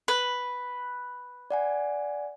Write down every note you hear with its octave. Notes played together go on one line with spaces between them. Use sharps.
B4
D5 F#5 G#5